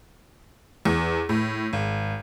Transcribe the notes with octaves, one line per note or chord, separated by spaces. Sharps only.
E2
A2
G#1